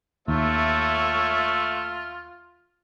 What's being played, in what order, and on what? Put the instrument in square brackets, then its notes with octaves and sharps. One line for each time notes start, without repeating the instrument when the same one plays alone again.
[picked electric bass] D#2 [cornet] A3 [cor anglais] F4 [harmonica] C#5 E5